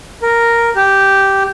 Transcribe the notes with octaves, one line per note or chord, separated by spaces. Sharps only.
A#4
G4